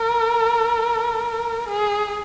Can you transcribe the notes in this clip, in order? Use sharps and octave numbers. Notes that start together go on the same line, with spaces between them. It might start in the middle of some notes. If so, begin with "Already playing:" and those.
Already playing: A#4
G#4